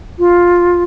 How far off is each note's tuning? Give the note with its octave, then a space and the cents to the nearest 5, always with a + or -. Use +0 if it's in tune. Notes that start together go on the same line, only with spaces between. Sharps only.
F4 +10